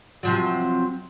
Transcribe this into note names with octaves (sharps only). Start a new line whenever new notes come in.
C3 F3 F#3